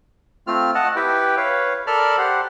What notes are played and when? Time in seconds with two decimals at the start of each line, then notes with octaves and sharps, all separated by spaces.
0.47 A3 C4 F4 F6
0.75 D#5 F#5 A5
0.96 E4 G4 B4 G5
1.37 B4 C#5 F5
1.87 A4 A#4 D5 A5 B5 F6
2.18 G4 C5 F#5